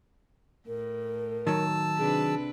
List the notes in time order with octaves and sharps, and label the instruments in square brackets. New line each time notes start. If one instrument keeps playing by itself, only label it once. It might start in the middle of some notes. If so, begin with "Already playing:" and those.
[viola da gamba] A2 [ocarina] A#4
[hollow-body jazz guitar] D#3 F#3 [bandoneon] A5 E6
[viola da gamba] C3 D4 B4 [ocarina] G#4